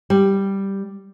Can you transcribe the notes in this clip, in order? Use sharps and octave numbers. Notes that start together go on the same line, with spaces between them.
G3